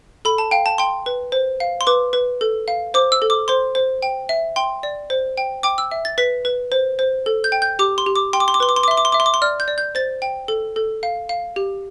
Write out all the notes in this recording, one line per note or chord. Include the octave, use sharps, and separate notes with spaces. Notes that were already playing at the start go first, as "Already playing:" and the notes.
A4 B5
A5
F5 G5
A5
G5 C6
B4
C5
F5
C6
B4 D6
B4
A4
F5
C5 D6
E6
A4
D6
C5 C6
C5
G5
E5
G5 C6
D5
C5
G5
G5 D6
E6
E5
A6
B4 B6
B4
C5
C5
A4
G6
G5
G6
G4 D6
C6
G4
D6
G5 C6
D6
C6
D6
B4 C6
D6
C6
D6
E5 C6
D6
C6
E5 D6
C6
D6
C6
D5 F6
G6
D5
G6
C5 A6
G5
A4
A4
F5
F5
G4